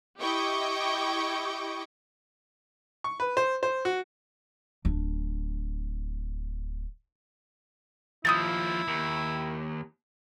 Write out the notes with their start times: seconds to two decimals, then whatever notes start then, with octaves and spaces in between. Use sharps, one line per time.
0.19 E4 G4 D#5 G5 C#6 D6
3.04 C#6
3.20 B4
3.37 C5
3.63 C5
3.85 F#4
4.85 D1 D4
8.25 D#2 F3 E4 D#6 G6 A6
8.88 D#2